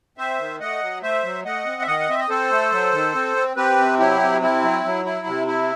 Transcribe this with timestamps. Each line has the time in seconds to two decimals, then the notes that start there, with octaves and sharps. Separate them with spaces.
0.18 C4 C5 E5
0.39 D#3
0.60 A3 D#5 F#5
0.82 F#3
1.02 A3 C5 E5
1.24 F#3
1.45 A3 D#5 F#5
1.66 C4
1.82 E5
1.87 D#3 D#5 F#5
1.99 F#5
2.09 C4 E5
2.19 D#5
2.29 C4 A4 C5
2.51 A3
2.72 F#3
2.93 D#3
3.15 C4
3.36 C4
3.57 C4 G4 B4
3.78 C3
3.99 F#3 E4 G4
4.21 C3
4.41 C4 E4
4.63 F#3
4.85 F#3
5.05 E4
5.27 C3
5.47 E4